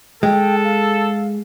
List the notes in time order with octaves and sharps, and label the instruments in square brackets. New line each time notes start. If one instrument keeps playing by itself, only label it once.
[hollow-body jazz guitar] G#3 [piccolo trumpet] A4 [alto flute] G5
[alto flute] F5